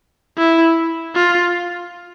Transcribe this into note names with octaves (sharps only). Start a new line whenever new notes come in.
E4
F4